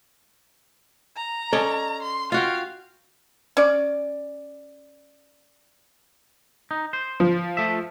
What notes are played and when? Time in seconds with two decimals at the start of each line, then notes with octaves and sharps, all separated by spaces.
1.16 A#5
1.53 C#4 A4 D5 D#5
2.02 C6
2.32 F4 F#4 F5 G5
3.57 C#4 D5
6.71 D#4
6.93 C5
7.20 F3
7.57 A3 E5